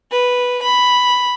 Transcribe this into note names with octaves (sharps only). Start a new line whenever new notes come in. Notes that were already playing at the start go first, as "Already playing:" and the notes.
B4
B5